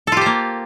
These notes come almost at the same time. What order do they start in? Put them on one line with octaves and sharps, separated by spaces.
A4 F4 G4 C5 A#3